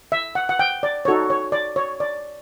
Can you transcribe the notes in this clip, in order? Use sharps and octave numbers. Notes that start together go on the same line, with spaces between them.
E5
F#5
F#5
G5
D5
D#4 F#4 A4 C#5
C#5
D5
C#5
D5